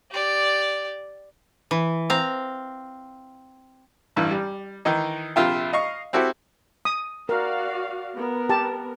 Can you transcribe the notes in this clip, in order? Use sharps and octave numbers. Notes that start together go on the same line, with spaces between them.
G4 D5
E3
C4 F5 A#5
A1 G2 E3
G3
D#3 E3 D#4
A#1 C3 F4 E5 G5
D#5 F5 C#6
C4 E4 F#4 G4 A4
D#6
F#4 A#4 D5 F5
B3 A#4
G4 A5